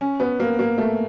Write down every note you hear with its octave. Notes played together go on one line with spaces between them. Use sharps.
C#4
B3
A#3
A#3
A3